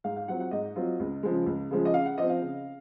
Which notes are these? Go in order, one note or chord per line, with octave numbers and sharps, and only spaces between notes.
G#2 F5
F5
F#3 C4 F4 F#5
F#5
G#2 D#5
F#3 C4 F4
C#2
C#3 F3 G#3
C#2
C#3 F3 G#3
D#5
C#3 F5
F#5
F3 C4 D#5
F5
C#3